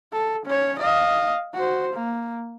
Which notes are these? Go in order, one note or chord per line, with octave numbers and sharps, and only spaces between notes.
A4
C#4 C#5
D#5 F5
F#4 C5
A#3